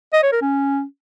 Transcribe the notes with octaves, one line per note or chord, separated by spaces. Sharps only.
D#5
C#5
A#4
C#4